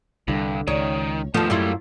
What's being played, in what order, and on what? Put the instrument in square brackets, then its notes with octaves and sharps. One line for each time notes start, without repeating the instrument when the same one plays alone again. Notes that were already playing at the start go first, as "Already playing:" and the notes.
[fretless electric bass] C2 D3 [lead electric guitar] G2
[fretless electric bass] C#2 [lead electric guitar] D#3 [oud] C#5
[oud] D#2 F3 [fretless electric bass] A3 [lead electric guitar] B3 A4
[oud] F#2 E4 F4 [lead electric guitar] G3 A#3